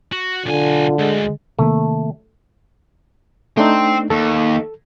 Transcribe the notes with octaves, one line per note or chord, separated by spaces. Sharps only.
F#4
B1 D3 F4 G#5
D2 G#3
C3 D#3 A3 A#3
A3 C4 D4 D#4
D#2 A4